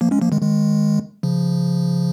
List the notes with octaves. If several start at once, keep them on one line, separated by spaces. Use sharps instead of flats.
F3 A#3
G#3 C#4
F3 A#3
D#3 G#3
D#3 G#3
C#3 F3